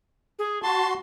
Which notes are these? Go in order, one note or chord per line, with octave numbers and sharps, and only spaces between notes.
G#4
F#4 A5 C6